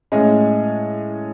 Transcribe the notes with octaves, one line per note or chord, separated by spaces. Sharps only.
A2 G#3 C#4 G#4 D#5